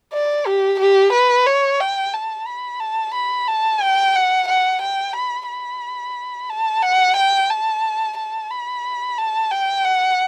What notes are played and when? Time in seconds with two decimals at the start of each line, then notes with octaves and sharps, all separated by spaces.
0.13 D5
0.46 G4
0.79 G4
1.12 B4
1.46 C#5
1.80 G5
2.13 A5
2.47 B5
2.80 A5
3.14 B5
3.48 A5
3.81 G5
4.15 F#5
4.48 F#5
4.81 G5
5.15 B5
5.49 B5
6.50 A5
6.82 F#5
7.17 G5
7.50 A5
8.17 A5
8.51 B5
9.18 A5
9.51 G5
9.84 F#5